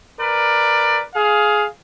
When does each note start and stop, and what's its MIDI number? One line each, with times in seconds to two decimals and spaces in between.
0.20 1.02 70
0.20 1.02 71
0.20 1.02 74
1.15 1.66 68
1.15 1.66 77